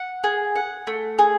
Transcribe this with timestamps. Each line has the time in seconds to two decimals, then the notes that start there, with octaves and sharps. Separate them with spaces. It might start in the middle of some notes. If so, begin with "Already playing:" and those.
Already playing: F#5
0.24 G#4
0.56 F#5
0.87 A3
1.19 G#4